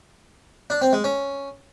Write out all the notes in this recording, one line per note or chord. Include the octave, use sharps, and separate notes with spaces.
D4
C4
G#3
C#4